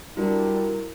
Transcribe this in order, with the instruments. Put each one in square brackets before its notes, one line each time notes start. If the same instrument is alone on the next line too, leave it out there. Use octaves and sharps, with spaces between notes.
[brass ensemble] G3 D4 [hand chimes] E4 F#4 A#4